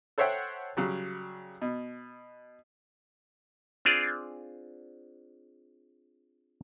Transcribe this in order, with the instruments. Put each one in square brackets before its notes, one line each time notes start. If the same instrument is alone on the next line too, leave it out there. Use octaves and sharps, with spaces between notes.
[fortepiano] A4 C5 C#5 E5 F#5 G5
C#3 F#3 G3
B2
[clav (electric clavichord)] C4 D4 F4 G#4 D5